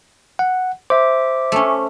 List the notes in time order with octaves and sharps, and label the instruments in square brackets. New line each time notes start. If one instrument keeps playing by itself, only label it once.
[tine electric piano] F#5
[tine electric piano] C5 [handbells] E5 D6
[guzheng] A3 C#4